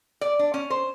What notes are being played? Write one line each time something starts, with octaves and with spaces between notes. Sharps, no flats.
D5
D4
C#4
C5